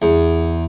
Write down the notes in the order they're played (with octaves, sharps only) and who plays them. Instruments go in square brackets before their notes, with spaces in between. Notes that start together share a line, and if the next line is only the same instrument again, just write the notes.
[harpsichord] E2